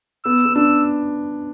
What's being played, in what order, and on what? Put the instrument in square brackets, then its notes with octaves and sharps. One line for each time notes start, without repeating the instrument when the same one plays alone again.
[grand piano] B3 [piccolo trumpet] E6
[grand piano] B3
[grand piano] D4 [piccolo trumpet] E6